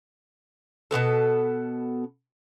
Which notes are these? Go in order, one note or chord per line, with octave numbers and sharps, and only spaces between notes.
B2 F3 B3 A4